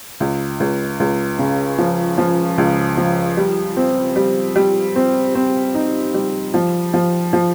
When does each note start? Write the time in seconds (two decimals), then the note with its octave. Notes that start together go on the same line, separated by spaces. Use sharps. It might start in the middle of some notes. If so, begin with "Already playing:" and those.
0.20 C#2
0.60 C#2
1.00 C#2
1.39 C#3
1.78 F3
2.18 F3
2.58 C#2
2.97 F3
3.37 G3
3.77 C4
4.16 G3
4.56 G3
4.96 C4
5.35 C4
5.75 D#4
6.14 G3
6.54 F3
6.94 F3
7.33 F3